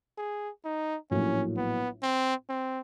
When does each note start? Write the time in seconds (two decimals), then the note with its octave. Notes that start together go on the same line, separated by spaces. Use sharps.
0.18 G#4
0.65 D#4
1.11 A#1 A2 F#3 A#3 C#4
1.57 B3
2.03 C4
2.49 C4